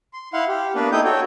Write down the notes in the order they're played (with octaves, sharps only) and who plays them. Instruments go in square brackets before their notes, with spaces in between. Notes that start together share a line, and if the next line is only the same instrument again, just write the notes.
[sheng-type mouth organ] C6
E4 F5 F#5 C6
G4
A#3 B3 D4 B4
D#4 E4 A4 G5 D#6 G6
F#4 A4 C#5 G5